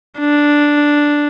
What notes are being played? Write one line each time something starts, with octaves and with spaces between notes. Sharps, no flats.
D4